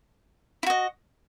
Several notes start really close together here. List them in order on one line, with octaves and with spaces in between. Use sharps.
E4 F#4 D#5